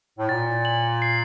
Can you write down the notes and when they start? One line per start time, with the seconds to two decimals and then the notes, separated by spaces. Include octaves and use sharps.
0.18 A2
0.29 A#2 A6
0.65 F#7
1.02 C7